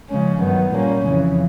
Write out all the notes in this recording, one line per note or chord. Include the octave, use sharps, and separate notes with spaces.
C#3 F3 G#3 C#4
G2 D#3 F#3 B3
A#2 G3 A#3 C#4
F2 C#3 E3